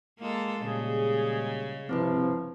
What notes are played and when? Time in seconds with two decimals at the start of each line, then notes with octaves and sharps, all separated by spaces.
0.19 G#3 A#3 F4 A4
0.62 A#2 C#3 G3 G#3 G#4
1.89 G#1 G2 C3 F3 C4 E4 B4